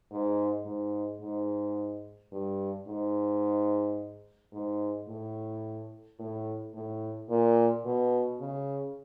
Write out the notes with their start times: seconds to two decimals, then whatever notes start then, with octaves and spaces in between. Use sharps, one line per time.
0.11 G#2
0.66 G#2
1.22 G#2
2.32 G2
2.88 G#2
4.53 G#2
5.08 A2
6.19 A2
6.74 A2
7.29 A#2
7.85 B2
8.40 C#3